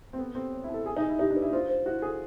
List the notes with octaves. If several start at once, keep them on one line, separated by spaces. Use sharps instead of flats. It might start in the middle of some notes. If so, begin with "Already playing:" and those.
C4
B3 A4
C4 A4
C#5
E4
A4 A5
G#4 G#5
D#4
G#5
E4
D#4 G4
D4
B4
E4
F4 C5
C5
E4 F#4
G#4 A4